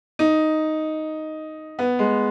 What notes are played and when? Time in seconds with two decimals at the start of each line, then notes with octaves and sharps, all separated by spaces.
0.19 D#4
1.79 B3
1.99 G#3